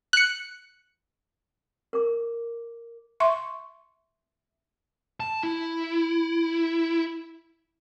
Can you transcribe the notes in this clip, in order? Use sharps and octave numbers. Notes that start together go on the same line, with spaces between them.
F#6 C#7
A#4 D6
E5 C6 C#6
A5
E4